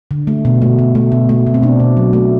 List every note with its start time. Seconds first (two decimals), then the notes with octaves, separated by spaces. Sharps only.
0.11 D3
0.27 A3
0.45 B2
0.62 A3
0.79 B2
0.95 A3
1.12 B2
1.29 A3
1.47 B2
1.54 C4
1.63 B2 D4
1.80 B2
1.97 F#3
2.13 A3